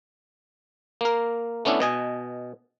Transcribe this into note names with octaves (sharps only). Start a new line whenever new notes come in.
A#3 A#4
A3 B3 C#4 D4 E4
B2 D#5 G#5